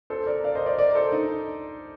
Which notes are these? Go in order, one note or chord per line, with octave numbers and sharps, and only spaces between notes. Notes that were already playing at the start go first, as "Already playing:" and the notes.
A4 C5
A#4 D5
D5 F5
C5 D#5
A#4 D5
A#4 D5
A4 C5
D#4